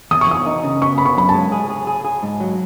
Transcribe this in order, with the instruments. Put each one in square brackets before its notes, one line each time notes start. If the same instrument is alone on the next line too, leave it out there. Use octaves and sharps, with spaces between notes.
[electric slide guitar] E2 [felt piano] D#6
[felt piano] C#6
[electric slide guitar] E2 [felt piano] D#6
[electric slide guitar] D#4
C#3
[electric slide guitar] B3 [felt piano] C#6
[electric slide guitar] B3 [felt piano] B5
[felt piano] C#6
[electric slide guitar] F#2 [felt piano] B5
[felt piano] A5
[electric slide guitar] G#3
G#4
G#4
G#4
G#4
G#2
F#3